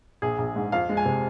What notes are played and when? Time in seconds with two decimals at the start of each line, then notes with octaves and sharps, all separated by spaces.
0.22 A#1 G#4
0.38 A#1
0.56 G#2
0.72 F2 F5
0.89 G#3
0.97 G#5
1.05 C3